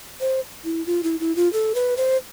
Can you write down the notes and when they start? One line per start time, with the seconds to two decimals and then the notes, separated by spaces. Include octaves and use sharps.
0.20 C5
0.65 E4
0.86 F4
1.03 E4
1.20 E4
1.36 F4
1.53 A4
1.75 B4
1.97 C5